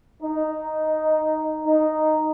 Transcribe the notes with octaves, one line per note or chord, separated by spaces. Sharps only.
D#4
D#4